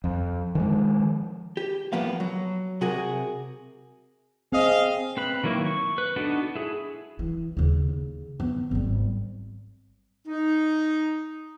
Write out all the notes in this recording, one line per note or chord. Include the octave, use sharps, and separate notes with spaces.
F2
D#3 F3 G#3
G4
A2 F3 A#3 B3 F5
F#3
C3 F#4 G#4 A#4
C4 G#4 D#5 F5
C4 B4 B5
D#3 F#3 A#3 E4
C#6
B4
B3 D4 D#4 F#4 A4
E4 G#4
E3
D#2 C#3
D#3 B3
G#1 G3
D#4